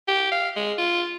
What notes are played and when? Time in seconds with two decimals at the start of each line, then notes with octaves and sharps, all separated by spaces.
0.08 G4
0.32 F5
0.56 G#3
0.78 F4